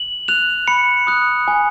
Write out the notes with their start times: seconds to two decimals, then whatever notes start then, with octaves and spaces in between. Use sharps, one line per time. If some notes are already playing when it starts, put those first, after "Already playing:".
Already playing: F#7
0.28 F#6 F7
0.67 B5 C#7
1.07 D#6 F#6
1.48 G#5